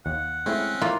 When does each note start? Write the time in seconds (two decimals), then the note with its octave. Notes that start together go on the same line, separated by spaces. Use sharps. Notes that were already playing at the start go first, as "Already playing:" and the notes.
0.06 D#2 F#5
0.46 G#3 A3 C4 C#4 E4
0.81 A#3 E4 F4